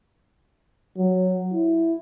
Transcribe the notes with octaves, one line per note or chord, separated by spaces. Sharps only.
F#3
E4